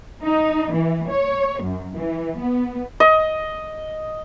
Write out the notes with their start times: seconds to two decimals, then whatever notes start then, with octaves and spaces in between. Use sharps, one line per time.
0.24 D#4
0.72 E3
1.11 C#5
1.61 F#2
1.95 E3
2.38 B3
3.00 D#5